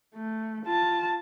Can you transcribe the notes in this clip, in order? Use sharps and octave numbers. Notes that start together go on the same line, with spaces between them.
A3
F4 A5